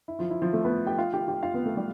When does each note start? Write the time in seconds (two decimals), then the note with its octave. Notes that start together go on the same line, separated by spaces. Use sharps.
0.08 E4
0.19 F3 F4
0.31 E4
0.42 F3 F4
0.53 A3 A4
0.65 B3 B4
0.87 G4 G5
0.98 F4 F5
1.13 G4 G5
1.28 G4 G5
1.43 F4 F5
1.54 B3 B4
1.66 A3 A4
1.77 G3 G4